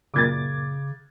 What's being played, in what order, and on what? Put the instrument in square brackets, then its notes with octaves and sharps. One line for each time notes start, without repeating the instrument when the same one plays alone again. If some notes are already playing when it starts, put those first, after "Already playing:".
[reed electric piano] F#2 A#2 [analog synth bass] C#3 [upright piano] D6 G#6 A6